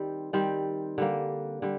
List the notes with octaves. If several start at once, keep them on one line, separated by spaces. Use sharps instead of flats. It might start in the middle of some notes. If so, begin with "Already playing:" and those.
Already playing: D#3 G3 C4
D#3 G3 C4
D3 G3 A#3
D3 G3